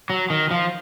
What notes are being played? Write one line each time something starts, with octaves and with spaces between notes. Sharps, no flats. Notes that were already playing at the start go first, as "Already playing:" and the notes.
F#3
D#3
F3